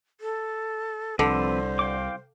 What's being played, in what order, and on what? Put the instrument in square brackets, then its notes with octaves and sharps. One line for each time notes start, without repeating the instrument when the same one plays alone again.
[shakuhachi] A4
[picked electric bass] C2 [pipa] D3 [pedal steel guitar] F3 C4 B4 [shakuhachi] C5
[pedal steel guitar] F5 G5 D6